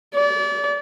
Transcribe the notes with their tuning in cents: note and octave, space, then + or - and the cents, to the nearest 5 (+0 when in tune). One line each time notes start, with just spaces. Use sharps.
D5 -30